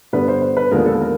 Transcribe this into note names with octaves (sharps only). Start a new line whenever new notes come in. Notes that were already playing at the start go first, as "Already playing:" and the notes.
G2 D3 G3 B3 B4
C5
C5
B4
D#2 D3 F3 G#3 B3 A#4
A4
A#4